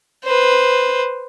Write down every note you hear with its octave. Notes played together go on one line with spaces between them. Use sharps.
B4 C5